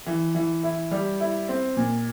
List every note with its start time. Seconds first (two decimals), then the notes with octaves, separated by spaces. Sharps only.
0.07 E3
0.35 E3
0.63 E4
0.91 G3
1.20 E4
1.49 C4
1.77 A#2